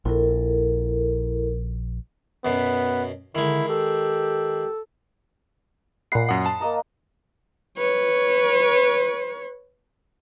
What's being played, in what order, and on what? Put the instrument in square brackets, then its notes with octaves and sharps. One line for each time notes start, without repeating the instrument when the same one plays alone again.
[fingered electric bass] A#1 [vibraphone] E4 A4 A#4
[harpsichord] F#2 B2 [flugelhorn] B3
[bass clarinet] D3 [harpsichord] D#3 G#3 [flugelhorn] E4
[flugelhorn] G4 [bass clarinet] A4
[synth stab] A#2 C7 [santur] F#5 B5
[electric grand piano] F#2 F#5 [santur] D#6
[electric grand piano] A5
[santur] A#3 D#5 A#5
[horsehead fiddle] B4 C#5